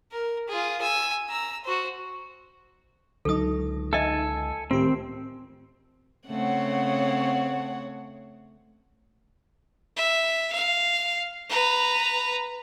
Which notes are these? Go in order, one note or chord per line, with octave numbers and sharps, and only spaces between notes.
A#4
F4 G#4
G#5 E6
A#5 E6
F#4 C5
C#2 D3 F#3 D#4 A4 D#6
A4 D#5 E5 G#5
A2 D#3 C4 F4 G4
C#3 A3 C4 C#5 F#5
E5
F5
B4 A#5